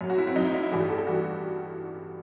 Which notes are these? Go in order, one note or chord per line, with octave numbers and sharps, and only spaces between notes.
F#2 F#3
F#4
E4
C4
F#2 F#3 D#4 E4
D#4
E4
A1 G2 E3 G3 F#4
G4
A4
G4
E3 G3 F#4